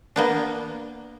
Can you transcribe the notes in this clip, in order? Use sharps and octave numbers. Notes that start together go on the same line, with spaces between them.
A#3 B3 D4